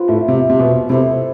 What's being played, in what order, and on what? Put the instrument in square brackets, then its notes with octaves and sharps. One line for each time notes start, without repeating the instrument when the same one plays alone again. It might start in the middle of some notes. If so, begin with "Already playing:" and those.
Already playing: [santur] F3 C4 F4 B4
[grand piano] A2 A3
C3
C3
B2
[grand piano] C3 [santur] E4 A4 C5